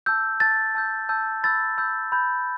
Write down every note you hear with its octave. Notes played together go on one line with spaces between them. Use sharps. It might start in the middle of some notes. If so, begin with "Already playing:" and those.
A5 E6 G6
A5 E6 G6 A6
A5 E6 G6
A5 E6 G6
B5 E6 G6 A6
B5 E6 G6
B5 E6 G6